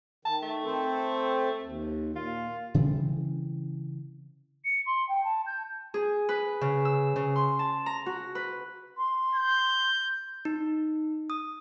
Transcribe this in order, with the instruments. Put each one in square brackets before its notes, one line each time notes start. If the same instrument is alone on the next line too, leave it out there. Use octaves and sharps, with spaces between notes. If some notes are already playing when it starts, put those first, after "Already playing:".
[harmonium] D#3 [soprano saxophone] A5
[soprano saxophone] A3
[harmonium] C4 A4 C5
D#2
[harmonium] A#2 [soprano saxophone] F4
[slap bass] C#3 E3 G3 C4
[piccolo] C#7
C6
G5
A5
G6
[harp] G#4
B4
C#3
E6
C#3
C6
A5
A#5
F#4
B4
[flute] C6
[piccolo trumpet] G6
[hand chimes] D#4
D#6